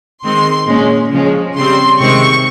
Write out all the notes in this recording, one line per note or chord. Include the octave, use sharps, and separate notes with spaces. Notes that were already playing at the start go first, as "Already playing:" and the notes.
D#3 G#3 C4 C6
A#2 G#3 C#4
C#3 F3 G#3 C#4
C#3 G3 C4 C6
C3 D#3 G#3 C4 C#6